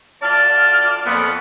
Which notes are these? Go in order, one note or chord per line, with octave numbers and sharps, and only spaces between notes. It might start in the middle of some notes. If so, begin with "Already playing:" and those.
D2 F4 D5 A5 F6
F2 A#3 B3